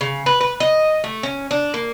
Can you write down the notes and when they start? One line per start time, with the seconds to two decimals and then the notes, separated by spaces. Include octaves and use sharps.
0.01 C#3
0.26 B4
0.41 B4
0.60 D#5
1.04 A3
1.23 C#4
1.51 D4
1.74 A#3